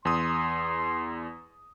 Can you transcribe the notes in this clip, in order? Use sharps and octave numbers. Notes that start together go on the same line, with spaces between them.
E2 C6 D#6